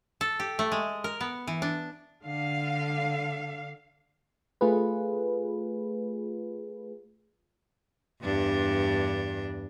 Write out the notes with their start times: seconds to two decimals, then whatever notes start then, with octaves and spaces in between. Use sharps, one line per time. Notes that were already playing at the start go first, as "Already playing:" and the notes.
0.21 A4
0.40 G4
0.59 A3
0.72 G#3
1.04 A#4
1.21 B3
1.47 E3
1.62 D4
2.24 D3 F5
4.61 A3 F4 G#4 B4
8.22 E2 G2 D4